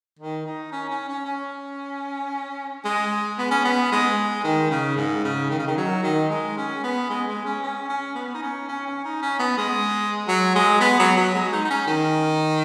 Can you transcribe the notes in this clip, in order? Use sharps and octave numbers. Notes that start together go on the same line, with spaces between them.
D#3
D#4
C#4
C#4
C#4
C#4
G#3
B3
C#4
B3
G#3
D#3
C#3
G#2
C#3
D#3
C#3
D#3
F#3
D#3
G#3
C#4
B3
G#3
G#3
C#4
C#4
C#4
B3
D#4
C#4
C#4
C#4
D#4
C#4
B3
G#3
F#3
G#3
B3
F#3
F#3
G#3
D#4
D#4
C#4
D#3